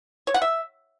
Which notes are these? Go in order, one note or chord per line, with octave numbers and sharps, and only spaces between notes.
C#5
F#5
E5